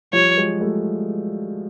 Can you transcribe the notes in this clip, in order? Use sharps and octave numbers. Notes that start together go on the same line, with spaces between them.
F3 G3 C#5
F#3 G#3
G3 A3